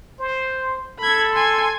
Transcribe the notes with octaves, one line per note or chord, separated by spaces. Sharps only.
C5
A4 B5 G#6
G#5 C6